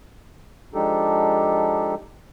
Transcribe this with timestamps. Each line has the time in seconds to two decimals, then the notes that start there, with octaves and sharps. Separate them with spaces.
0.74 F3 G#3 D4 D#4 G4 A4